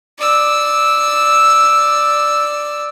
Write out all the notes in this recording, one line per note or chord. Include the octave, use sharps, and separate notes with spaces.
D5 E6